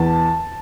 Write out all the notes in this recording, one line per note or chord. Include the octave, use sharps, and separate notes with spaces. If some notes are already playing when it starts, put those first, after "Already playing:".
Already playing: E2 A5